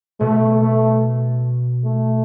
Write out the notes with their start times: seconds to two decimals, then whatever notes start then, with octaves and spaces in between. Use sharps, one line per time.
0.20 B2 A3
0.62 A3
1.85 A3